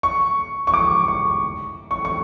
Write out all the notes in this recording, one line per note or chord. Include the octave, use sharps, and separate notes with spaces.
C#6
C#6
D6
C#6
C#6
C#6